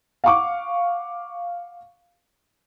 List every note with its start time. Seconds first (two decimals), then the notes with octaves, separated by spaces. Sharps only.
0.24 F5 F#5 C#6 D6